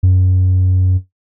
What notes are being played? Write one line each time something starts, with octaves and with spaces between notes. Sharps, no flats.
F#2